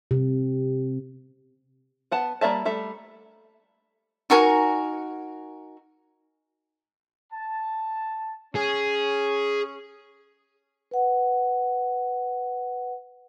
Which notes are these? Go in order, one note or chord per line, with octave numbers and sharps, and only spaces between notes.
C3
B3 F#5 A5
G3 A#3 D5 E5 A5
G3 A3 E5
D#4 F#4 A#4 G#5
A5
C#4 G#4
B4 F#5